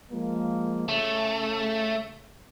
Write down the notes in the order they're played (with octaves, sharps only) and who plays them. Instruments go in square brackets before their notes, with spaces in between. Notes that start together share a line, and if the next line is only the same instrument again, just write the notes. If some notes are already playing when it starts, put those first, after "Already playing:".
[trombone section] F3 G#3 A#3
[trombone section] C#3 [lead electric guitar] A3